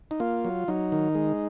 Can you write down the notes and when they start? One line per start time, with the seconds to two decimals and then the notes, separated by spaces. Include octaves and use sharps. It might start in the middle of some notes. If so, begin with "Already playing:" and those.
0.11 D#4
0.20 A#3 F4
0.45 F#3
0.68 F#3 D#4
0.92 D#3
1.15 G#3